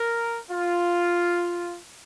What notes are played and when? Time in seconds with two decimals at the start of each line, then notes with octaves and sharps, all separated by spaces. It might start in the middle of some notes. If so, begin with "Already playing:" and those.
Already playing: A#4
0.50 F4